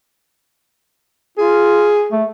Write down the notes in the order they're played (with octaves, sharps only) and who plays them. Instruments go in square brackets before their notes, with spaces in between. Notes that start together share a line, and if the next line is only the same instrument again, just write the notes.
[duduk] F4 [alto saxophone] G#4
[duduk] A3